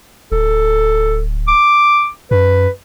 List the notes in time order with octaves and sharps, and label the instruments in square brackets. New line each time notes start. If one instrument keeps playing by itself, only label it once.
[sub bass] D1 [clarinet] A4
[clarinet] D6
[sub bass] F#2 [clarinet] B4